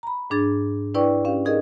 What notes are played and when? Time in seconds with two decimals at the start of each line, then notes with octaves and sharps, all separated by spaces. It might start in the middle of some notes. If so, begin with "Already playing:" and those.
0.03 A#5 B5
0.30 G#2 D4 G#4 A6
0.94 D4 E4 B4 D5 G5 C#6
1.25 C#4 G4 F5
1.45 D#4 G#4 A#4 D#5